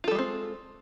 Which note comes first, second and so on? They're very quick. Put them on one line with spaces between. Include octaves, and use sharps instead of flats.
F4 A4 G3 G#3 C4